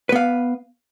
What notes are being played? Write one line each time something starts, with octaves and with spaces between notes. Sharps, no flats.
B3 B4 F5